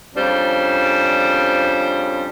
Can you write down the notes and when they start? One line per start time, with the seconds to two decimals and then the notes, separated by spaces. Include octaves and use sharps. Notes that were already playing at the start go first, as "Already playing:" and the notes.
0.15 F2 C#3 G3 D4 C5